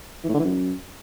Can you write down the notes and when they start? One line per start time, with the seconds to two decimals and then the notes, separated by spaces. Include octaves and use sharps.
0.24 E3
0.29 A2
0.34 D3
0.39 E3
0.44 F#2